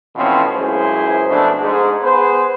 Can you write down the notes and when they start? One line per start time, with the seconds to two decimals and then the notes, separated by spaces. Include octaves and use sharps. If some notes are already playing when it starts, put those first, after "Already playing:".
0.16 B2 E3 F3 A3 C4 C#4
0.57 C#2 F#2 A#2 E4 G#4 C5
1.30 B2 F3 A3 D4
1.61 G#2
2.03 B3 G#4 B4 C5